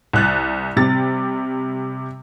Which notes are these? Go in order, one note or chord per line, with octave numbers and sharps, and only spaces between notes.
C2 F#6 A6
C3 G3 A6